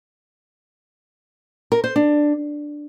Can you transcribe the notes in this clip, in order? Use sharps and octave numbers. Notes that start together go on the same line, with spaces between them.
A#4
C5
D4